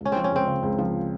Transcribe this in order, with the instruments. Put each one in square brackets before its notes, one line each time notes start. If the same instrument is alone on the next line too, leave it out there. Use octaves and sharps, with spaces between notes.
[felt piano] C#2 [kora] C#4
[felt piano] F3 [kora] C4
[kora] C#4
[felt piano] C#2 [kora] C4
[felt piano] C#3
C#2
F3